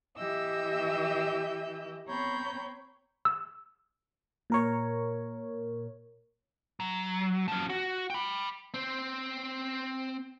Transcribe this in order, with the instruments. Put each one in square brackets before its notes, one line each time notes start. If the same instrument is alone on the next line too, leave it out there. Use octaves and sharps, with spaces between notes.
[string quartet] E3 G4 D#5 E5 E6 G6
B3 C4 C#5 A#5 B5 G6
[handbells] E6
[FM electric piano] A#2 A#4 C#5
[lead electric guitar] F#3
F3 C#4
F#4
G5 B5
[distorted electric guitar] C4 C5